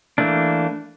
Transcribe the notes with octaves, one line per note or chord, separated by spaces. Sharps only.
E3 A3 A#3 D4